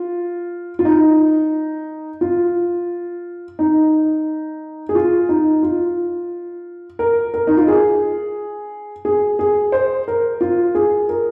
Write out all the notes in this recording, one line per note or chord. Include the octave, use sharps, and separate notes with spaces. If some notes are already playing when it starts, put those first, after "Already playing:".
Already playing: F4
F4
D#4
F4
D#4
G#4
F4
D#4
F4
A#4
A#4
D#4
F4
G#4
G#4
G#4
C5
A#4
F4
G#4
A#4